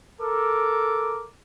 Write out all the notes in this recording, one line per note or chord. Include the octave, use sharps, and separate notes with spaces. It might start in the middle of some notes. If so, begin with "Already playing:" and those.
A4 A#4 D6